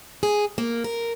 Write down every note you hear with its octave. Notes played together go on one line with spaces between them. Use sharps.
G#4
A#3
A#4